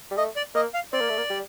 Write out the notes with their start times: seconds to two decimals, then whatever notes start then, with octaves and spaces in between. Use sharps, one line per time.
0.11 G3
0.17 A3 D#5
0.36 D5
0.55 A#3 D#5
0.74 F5
0.93 C4 D5
1.01 A#3
1.09 A3
1.17 A#3
1.30 G3